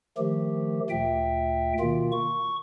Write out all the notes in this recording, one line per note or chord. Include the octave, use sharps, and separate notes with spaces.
D#3 F3 A3 G4
D2 A#2 E5 G5
B2 D#3 A#3 F4
C#6